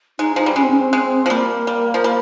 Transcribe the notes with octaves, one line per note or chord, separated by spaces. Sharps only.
G#3 D#4
F3 D#4
G3
G#3 C#4
C4
C#4
C4
G#3
C4
F3
G3 A#3
G3
F3
G3